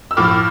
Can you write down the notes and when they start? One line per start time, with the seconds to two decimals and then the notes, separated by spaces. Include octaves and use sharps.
0.11 E6
0.17 A2 F3 D6 F6